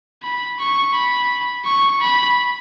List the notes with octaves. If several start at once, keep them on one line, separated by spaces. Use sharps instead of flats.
B5
C#6
B5
C#6
B5